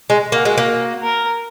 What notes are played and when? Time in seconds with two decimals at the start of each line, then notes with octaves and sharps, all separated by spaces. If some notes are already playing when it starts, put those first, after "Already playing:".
0.10 G#3
0.32 A#3 F#4
0.45 G#3
0.58 A#3
1.03 A#4